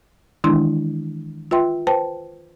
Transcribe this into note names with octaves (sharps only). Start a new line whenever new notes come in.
D#3 E3 G#3 D4 E4 C6
F4 B4 E5 G5 C6
B4 C5 G5 A5